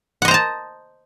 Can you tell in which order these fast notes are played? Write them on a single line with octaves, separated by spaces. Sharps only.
F#5 D#5 C5 A#5 A5